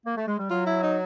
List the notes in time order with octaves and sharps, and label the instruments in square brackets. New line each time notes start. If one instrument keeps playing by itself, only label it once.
[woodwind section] A#3
A3
G#3
G3
[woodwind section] F#3 [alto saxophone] F4
[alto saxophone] E4
D#4